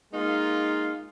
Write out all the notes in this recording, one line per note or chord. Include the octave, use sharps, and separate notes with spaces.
G#3 A#3 D#4 F4